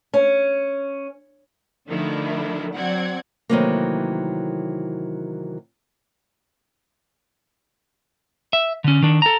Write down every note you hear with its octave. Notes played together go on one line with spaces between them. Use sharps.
C#4
D3 D#3 F3 A3 D4 E4
F#3 C4 D5 F#5 G#6
C3 D#3 E3 F#3 A3 A#3
E5
D3 C#4
D#3 D4
A4 A#5